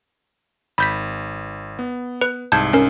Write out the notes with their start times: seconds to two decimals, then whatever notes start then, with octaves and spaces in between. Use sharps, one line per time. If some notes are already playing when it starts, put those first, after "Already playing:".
0.78 G#1 B5 G6 B6
1.79 B3
2.21 B4
2.52 C2 G#2 A5 G6 G#6
2.73 C#4 A#4